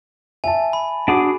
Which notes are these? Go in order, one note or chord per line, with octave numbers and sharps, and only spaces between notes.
E5 G#5 A5
B5
D4 F#4 G#4 F#5 D6